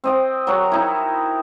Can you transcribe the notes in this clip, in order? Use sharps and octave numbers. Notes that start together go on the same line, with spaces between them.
C4 D#5 G5
F#3 F#4 A#4 A#5
D#4 E4